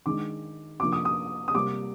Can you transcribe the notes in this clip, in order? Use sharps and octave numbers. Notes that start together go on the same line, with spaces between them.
D#3 G#3 D4 D6
C3 F3 A#3 D4 D6
D#6
D#6
D#6
C3 G3 A#3 D6